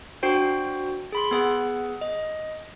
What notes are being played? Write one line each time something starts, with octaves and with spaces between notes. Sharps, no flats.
D4 F#4 C5 G5
G#4 B5 C6
B3 G#4 F#5
D#5